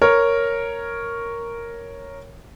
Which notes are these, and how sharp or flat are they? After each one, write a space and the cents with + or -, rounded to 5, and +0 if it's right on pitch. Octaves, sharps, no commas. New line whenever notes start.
A#4 +0 C#5 +0